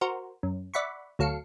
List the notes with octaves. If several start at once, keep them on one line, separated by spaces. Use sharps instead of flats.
F#4 A#4 C5
F#2
D5 E5 F#5 B5 C#6
D2 F#3 A4 F5 C7 C#7